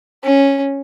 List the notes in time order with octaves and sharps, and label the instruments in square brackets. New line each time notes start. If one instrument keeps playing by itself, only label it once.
[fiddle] C#4